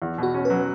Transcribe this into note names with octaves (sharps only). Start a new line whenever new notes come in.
E2
B2 F#4
C#4
B4
F#3